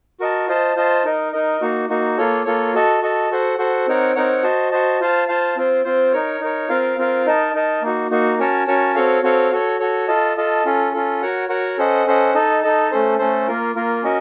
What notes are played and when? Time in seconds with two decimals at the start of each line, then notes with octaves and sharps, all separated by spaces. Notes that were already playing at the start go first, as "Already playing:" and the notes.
0.20 F#4 A#4 D#5 A5
0.47 F4 C5 D#5 A5
0.76 F4 C5 D#5 A5
1.04 D#4 A#4 D#5
1.33 D#4 A#4 D#5
1.61 A#3 D#4 F#4
1.89 A#3 D#4 F#4
2.18 A#3 F4 A4 C#5
2.45 A#3 F4 A4 C#5
2.74 F#4 A4 D#5 A5
3.02 F#4 A4 D#5 A5
3.31 F#4 A4 C5 F#5
3.58 F#4 A4 C5 F#5
3.87 C4 D#4 A#4 C#5 F#5
4.16 C4 D#4 A#4 C#5 F#5
4.43 F#4 C5 D#5 A5
4.71 F#4 C5 D#5 A5
5.00 F4 C5 F5 A5
5.28 F4 C5 F5 A5
5.56 C4 F4 C5
5.84 C4 F4 C5
6.13 D#4 A#4 C#5
6.41 D#4 A#4 C#5
6.69 C4 F4 A#4 F5
6.98 C4 F4 A#4 F5
7.26 D#4 A#4 D#5 A5
7.54 D#4 A#4 D#5 A5
7.82 A#3 D#4 F#4
8.11 A#3 D#4 F#4
8.39 C#4 F#4 A#4 C#5 A5
8.67 C#4 F#4 A#4 C#5 A5
8.95 C4 F#4 A4 C#5 F5
9.23 C4 F#4 A4 C#5 F5
9.51 F#4 A4 C#5
9.80 F#4 A4 C#5
10.08 F4 A4 D#5 A5
10.37 F4 A4 D#5 A5
10.65 C#4 F4 A4
10.93 C#4 F4 A4
11.22 F#4 A#4 C#5 F#5
11.49 F#4 A#4 C#5 F#5
11.78 C#4 A4 C5 D#5 F#5
12.06 C#4 A4 C5 D#5 F#5
12.34 D#4 A4 D#5 A5
12.62 D#4 A4 D#5 A5
12.91 A3 C#4 A4 C5
13.19 A3 C#4 A4 C5
13.47 A#3 F4 A#4
13.75 A#3 F4 A#4
14.03 C#4 F#4 A#4 D#5